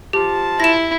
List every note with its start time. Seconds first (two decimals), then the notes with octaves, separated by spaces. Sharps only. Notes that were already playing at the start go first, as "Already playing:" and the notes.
0.13 F3 G4 A5
0.60 E4 A#6 E7